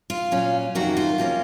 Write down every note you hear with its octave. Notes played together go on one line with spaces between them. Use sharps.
F4
A#2 F#3 C#4
F2 C3 D#3 F#3 A#3 F#4
F4
C3 F3 A#3 C#4